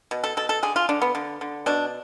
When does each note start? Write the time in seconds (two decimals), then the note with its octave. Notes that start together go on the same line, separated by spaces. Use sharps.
0.11 B2
0.24 A4
0.37 B2 A4
0.49 A4
0.63 D3 G#4
0.76 F4
0.89 D3 D4
1.02 B3
1.15 D3
1.41 D3
1.66 B2 D4